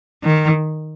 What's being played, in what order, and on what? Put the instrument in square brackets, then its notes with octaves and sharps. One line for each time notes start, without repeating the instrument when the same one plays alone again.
[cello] D#3